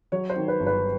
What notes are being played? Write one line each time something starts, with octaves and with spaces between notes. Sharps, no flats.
F#3 C#5
C5
D#3
B4
G1
B4